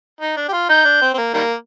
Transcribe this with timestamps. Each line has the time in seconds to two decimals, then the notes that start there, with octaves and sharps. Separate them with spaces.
0.21 D#4
0.37 D4
0.49 G4
0.53 F4
0.69 D#4 G6
0.85 D4
1.01 C4
1.14 C4
1.18 A#3
1.34 D#3 G3 A#3